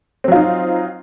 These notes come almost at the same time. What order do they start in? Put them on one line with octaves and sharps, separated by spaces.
C4 F#3 F4 D#4